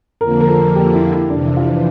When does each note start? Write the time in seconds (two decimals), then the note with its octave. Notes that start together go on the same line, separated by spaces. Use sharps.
0.21 F2 D3 F3 A#3 A#4
0.41 A#4
0.48 A4
0.76 G4
0.94 E4
1.12 E4
1.30 F2 C3 E3 D4
1.57 F4